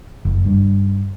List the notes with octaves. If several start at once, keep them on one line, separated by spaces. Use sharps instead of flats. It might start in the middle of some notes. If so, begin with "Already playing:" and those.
F#1
G2